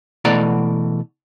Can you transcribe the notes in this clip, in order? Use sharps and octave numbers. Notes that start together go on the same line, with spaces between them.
B2 E3 A3 D5 F#5 A#5